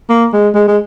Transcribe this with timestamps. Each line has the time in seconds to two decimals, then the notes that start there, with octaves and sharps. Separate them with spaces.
0.09 A#3
0.33 G#3
0.54 G#3
0.68 G#3